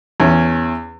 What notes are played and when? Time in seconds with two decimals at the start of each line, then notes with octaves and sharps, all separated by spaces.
0.20 E2 C#4